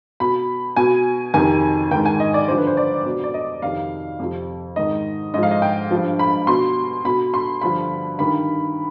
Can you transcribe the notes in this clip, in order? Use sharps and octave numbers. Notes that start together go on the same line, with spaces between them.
B2 B5
B2 G#5
F2 C3 D#3 G#5
G#2 D#3 G5
G#5
D#5
D5
G2 D3 F3 C5
B4
C5
D5
B2
D5
D#5
F2 C3 D#3 F5
F2 C3 F3
G#2 D#3 D#5
G#2 F3 D#5
F5
D#5
G5
G2 F3
B5
B2 C6
B2 B5
C6
G2 D3 F3 B5
G2 D#3 B5